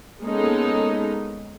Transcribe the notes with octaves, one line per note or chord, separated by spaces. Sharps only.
G#3 A#3 B3 C#4 D#4 A4